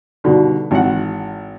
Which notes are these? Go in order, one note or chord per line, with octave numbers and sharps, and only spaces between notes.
G2 B2 D3 D#3
G#1 E3 F#5